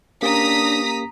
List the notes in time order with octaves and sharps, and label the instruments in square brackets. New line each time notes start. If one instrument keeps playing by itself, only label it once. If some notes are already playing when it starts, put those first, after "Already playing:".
[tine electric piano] A#3 C#4 G4 [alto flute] D4 [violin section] A#5 D#6 B6